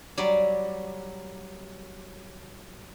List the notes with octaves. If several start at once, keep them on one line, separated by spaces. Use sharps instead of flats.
F#3 G3 D5